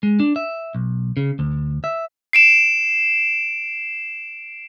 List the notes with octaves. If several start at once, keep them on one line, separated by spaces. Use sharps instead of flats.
G#3
D4
E5
B1
C#3
D2
E5
C7 D7 E7